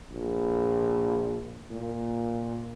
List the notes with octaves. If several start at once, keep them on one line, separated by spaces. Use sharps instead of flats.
A#1
A#2